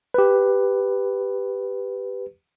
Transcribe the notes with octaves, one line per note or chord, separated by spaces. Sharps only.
G4 B4